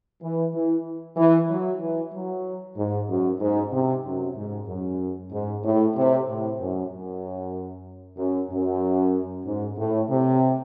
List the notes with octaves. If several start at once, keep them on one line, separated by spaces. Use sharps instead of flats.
E3
E3
E3
F#3
E3
F#3
G#2
F#2
G#2
C3
F#2
G#2
F#2
G#2
A2
C3
A2
F#2
F#2
F#2
F#2
G#2
A2
C3